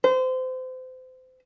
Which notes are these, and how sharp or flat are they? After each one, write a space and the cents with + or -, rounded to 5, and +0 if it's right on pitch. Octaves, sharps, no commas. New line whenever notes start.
C5 -30